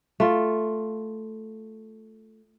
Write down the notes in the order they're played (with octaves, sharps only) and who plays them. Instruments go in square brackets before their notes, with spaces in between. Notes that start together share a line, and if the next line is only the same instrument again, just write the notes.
[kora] A3 F4